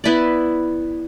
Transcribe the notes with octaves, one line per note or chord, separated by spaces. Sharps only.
B3 E4 B4 D5